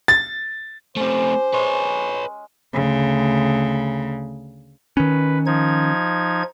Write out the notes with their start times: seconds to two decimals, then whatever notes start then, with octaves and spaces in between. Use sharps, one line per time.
0.08 A6
0.96 A3 C4 C#4 G4 C5
1.53 G#3 B4 C#5
2.73 D2 C#3
4.97 D#3 C#4 B4
5.46 F3 D#4 G#6